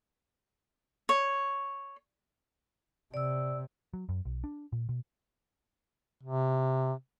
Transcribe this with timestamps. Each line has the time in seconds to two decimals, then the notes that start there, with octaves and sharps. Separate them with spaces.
1.09 C#5
3.14 C3 D5 E6
3.94 F#3
4.09 F#2
4.25 B1
4.44 D4
4.72 A#2
4.89 B2
6.23 C3